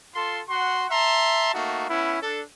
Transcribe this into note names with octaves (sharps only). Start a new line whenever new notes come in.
F4 A4 C6
F#4 F#5 C6
E5 A5 A#5 C6
A3 A#3 D#4 F#4
B3 C#4 E4
D4 A4